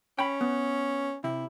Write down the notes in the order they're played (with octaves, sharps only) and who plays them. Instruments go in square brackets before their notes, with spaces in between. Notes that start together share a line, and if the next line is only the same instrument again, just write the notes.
[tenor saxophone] C#4 [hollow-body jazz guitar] G5 B5
[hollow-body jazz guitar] B3
[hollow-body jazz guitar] C3 [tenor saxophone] E4